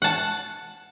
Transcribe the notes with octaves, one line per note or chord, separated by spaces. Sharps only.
F#5 A5